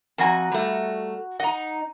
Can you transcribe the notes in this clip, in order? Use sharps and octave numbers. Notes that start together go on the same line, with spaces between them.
F2 F#4 G#5 A#5
G3 A3
D#4 F#5 A#5